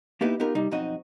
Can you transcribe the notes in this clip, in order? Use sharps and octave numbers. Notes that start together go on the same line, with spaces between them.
A#3 B3 D#4 E4 G4 B4
B3 D#4 F4 G4 A#4
C3 G3 D#4
B1 F2 C4 D#4 F#4 D#5